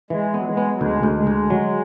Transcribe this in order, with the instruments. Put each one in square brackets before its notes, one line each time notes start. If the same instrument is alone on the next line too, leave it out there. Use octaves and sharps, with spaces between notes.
[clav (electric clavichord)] E3 [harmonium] G#3
[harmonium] F#3 [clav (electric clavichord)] B3
[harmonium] G#3
[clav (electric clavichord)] B3
[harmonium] F#3
[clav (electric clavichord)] D2 [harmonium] G#3
[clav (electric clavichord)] D2
[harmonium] G#3
[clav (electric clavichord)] D2
F#3